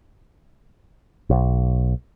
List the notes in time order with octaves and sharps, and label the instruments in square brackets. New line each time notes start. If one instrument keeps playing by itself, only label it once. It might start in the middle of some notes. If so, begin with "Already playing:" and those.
[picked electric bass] B1